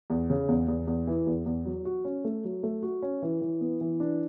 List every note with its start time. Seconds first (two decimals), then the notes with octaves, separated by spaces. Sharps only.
0.10 E2
0.30 C#3
0.48 E2
0.68 E2
0.87 E2
1.07 E3
1.27 E2
1.46 E2
1.65 F#3
1.85 F#4
2.05 C#4
2.24 A3
2.45 F#3
2.63 A3
2.83 F#4
3.02 C#4
3.22 E3
3.41 E3
3.61 B3
3.81 E3
4.00 D4